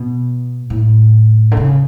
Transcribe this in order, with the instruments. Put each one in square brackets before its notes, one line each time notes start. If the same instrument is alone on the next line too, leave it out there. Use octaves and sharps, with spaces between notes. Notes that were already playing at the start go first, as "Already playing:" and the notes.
Already playing: [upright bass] B2
A2
D3
C#3